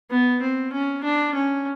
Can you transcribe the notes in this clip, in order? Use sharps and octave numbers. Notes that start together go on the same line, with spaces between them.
B3
C4
C#4
D4
C#4